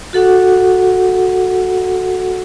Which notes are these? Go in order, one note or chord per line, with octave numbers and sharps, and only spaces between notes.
F#4 A4 F#5